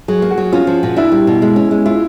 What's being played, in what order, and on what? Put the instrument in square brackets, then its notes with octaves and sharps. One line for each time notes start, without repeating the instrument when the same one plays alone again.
[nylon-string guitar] F#3 [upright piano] G#4
[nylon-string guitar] A#3
[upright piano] F#4
[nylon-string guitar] F#3
[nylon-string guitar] C#4 [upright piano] F4
[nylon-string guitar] F3
A#2
[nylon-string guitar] D4 [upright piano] E4
[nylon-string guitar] G3
B2
G#3
C#4
G#3
[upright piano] E4 [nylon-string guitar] F4